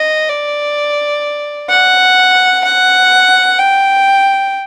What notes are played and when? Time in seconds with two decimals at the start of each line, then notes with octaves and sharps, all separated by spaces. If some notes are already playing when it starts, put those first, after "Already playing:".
Already playing: D#5
0.30 D5
1.70 F#5
2.65 F#5
3.59 G5